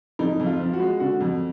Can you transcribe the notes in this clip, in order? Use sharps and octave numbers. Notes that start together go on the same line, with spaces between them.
F2 D#4
F2
F4
F3
F#4
G#3
D3 F#4
F2